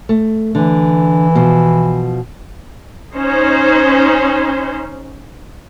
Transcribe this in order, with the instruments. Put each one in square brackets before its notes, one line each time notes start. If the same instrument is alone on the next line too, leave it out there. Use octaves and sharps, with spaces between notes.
[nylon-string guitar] A3
[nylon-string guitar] D3 [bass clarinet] E3
[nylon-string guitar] B2 F3
[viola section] C#4 D#4 C5